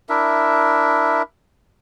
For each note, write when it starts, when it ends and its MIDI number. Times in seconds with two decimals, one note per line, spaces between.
0.09 1.22 62
0.09 1.22 64
0.09 1.22 70
0.09 1.22 76